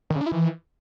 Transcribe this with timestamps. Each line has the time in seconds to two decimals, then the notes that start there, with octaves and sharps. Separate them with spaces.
0.10 D#3
0.16 C#3
0.21 D4
0.26 E4
0.32 E3